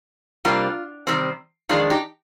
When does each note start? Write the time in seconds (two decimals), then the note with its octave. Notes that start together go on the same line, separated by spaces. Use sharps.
0.45 C3 G3 A#3 D4 F4
1.07 C3 D#3 G3 C4
1.69 F2 D#3 G#3 D4 F4
1.90 D#4 G4